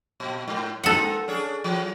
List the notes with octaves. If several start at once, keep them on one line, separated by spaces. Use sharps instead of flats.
A#2
G#2
A#3 C4 D#4 A4 F#5
C#4 D4 G#4
E3 F#3